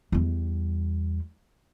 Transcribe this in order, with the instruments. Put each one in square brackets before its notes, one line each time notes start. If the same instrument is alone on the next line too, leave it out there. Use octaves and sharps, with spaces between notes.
[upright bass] E2 G3